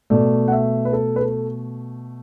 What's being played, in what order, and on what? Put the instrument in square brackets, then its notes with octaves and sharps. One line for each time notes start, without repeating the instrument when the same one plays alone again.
[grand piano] B2 A3 D5
F#5
E5
B4
A4
B4
A4